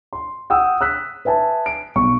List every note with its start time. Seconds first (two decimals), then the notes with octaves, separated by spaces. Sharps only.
0.13 C6
0.50 F#5 G5 D#6 E6
0.81 E6 F#6 B6
1.25 B4 E5 G#5 A5
1.66 D7
1.96 B1 C#6